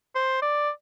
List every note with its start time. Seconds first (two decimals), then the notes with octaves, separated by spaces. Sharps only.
0.15 C5
0.42 D5